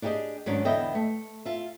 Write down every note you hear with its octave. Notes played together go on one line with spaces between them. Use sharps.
D4 E4 G4 G#4 D#5
G#2 D#3 F#3 C#4 D4
E2 D3 B3 D#5 E5 G5
A3
F4 E5